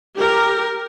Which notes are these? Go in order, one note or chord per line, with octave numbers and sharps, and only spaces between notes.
G4 A#4